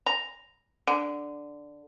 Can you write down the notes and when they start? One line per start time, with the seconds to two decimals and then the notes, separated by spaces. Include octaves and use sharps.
0.06 A#5
0.87 D3